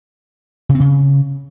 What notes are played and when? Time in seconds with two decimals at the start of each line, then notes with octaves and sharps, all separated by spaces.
0.69 C#3
0.75 C4
0.80 C#3